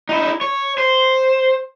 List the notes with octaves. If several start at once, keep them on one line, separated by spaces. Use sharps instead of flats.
D#4 E4
C#5
C5